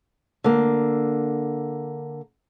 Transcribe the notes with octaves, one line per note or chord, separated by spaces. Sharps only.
D3 A#3